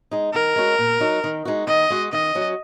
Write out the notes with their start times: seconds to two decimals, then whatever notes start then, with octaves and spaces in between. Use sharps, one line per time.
0.11 G#3 D#4
0.34 D#3 A#4
0.56 G#3 C#4 F#4
0.79 A#2
1.00 F#3 D#4 F#4
1.24 D#3
1.45 G#3 D#4 F#4
1.67 D#3 D#5
1.90 G#3 F#4
2.13 D#3 D#5
2.35 F#3 C#4 F#4